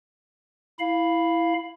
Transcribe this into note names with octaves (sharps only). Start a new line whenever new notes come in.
E4 F5 B5